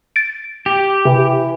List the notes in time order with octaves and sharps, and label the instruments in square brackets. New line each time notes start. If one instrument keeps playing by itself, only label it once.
[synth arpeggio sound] A6 D7
[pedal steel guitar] G4
[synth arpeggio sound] C3 [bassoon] E3